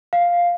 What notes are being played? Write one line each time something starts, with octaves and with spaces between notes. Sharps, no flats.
F5